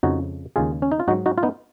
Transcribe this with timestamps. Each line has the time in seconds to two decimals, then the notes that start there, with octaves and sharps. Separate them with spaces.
0.03 F2 C#3 F3 G#3 D#4 F#4
0.56 D#2 C#3 G#3 F4 G#4
0.82 C#4
0.92 D#4
1.00 F4
1.08 G#2 F#3 D#4 F#4
1.26 D#4 F#4
1.38 F4
1.43 B3 D#4